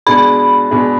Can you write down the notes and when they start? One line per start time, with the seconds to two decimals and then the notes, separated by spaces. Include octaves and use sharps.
0.06 B2 G#3 D4 G#4 B5
0.71 B2 G#3 D4 G#4